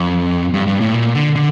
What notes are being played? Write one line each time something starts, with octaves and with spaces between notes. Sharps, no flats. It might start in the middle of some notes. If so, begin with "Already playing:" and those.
Already playing: F2
G2
G2
A2
A#2
D3
D3